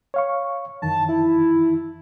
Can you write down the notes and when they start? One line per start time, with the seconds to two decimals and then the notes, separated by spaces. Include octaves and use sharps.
0.14 C#5 F5 C#6
0.82 F#2 D#3 E3 A5
1.09 E4